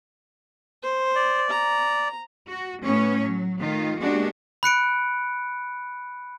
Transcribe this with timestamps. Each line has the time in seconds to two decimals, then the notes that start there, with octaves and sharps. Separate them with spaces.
0.83 C5
1.15 D5
1.50 A#5
2.50 F#4
2.85 A2 B3 C#4 C#5
3.20 F#3
3.62 D#3 A3 F4
4.00 G#3 A#3 B3 D4 F#4 G4
4.63 B5 F#6 C#7 D7